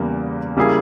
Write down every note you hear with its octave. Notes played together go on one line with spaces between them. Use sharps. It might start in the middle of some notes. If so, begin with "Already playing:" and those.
Already playing: E2 C#3 E3 G3 A#3
C#3 G3 A#3 E4 G#4